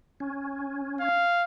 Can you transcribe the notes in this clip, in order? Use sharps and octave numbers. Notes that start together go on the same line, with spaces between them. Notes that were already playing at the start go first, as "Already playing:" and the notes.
C#4
F5